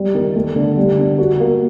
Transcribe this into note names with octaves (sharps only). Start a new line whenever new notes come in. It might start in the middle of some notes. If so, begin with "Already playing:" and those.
Already playing: G3
D#3
A3
D3
G3
D3
F#4
A#3